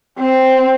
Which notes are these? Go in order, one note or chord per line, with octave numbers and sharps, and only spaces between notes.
C4